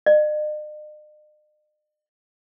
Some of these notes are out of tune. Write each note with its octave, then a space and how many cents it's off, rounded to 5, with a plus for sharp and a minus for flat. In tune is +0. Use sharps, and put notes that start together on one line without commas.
D#5 -45